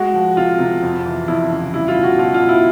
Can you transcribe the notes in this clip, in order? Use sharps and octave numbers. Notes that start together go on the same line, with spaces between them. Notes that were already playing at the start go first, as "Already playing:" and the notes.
Already playing: G#3 F#4
F3
C3 F4
C3
F2
E3
F2 E4
C#3
G3 E4
F4
B2
F#4
B2 F4
F4
B2
E4